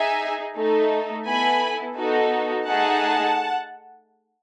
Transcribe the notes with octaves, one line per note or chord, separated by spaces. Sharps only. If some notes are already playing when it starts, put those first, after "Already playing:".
Already playing: D#4 G#4 E5 G#5
A3 D#4 A4
B3 E4 A4 G#5 B5
B3 D#4 F#4 A4
A3 D#4 G#4 F#5 A5